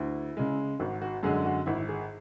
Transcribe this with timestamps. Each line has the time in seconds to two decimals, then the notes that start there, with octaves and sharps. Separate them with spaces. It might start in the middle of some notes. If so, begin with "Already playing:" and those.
Already playing: D2 E4
0.37 C#3 G#3
0.80 G#1 F#4
1.02 F#4
1.23 F#2 D3 G#3 G#4
1.45 F#4
1.66 G#1 E4
1.89 G#4